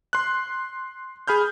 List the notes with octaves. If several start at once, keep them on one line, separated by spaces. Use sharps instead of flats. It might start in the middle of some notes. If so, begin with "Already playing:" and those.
C6 F#6
G#4 B5 F6 G6